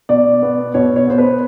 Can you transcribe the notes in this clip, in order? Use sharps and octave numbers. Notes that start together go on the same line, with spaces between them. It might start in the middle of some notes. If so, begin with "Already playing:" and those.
B2 D5
B3
B2 C#5
C#5
B3 C5
B4